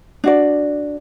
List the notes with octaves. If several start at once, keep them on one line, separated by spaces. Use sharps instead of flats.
D4 F#4 D5